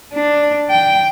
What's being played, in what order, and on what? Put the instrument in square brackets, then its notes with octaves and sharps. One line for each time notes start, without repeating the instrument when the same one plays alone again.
[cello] D4
G5